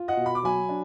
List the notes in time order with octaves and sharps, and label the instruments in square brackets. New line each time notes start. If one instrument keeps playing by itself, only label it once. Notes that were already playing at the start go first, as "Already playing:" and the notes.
Already playing: [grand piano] F4
D#5 F#5
B2
B5
D6
F#3 G#5 B5
D4